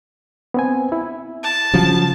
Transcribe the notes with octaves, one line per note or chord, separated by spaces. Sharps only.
B3 C4 G#5
E4
A5
C#3 F3 F#3